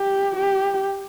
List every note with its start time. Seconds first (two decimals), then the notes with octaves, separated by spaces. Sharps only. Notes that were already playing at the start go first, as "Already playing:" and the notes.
Already playing: G4
0.36 G4